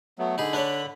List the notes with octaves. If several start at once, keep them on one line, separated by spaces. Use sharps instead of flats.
F#3 A3 B3
D3 D#4 G#4 B5
D4 B4 C#5